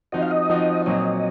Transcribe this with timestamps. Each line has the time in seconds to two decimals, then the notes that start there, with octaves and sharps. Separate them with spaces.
0.12 F3 C4 D#4 F#4 D#5
0.22 F5
0.31 D#5
0.50 F3 C4 D#4 F#4
0.86 A#2 F#3 C4 F#4 D#5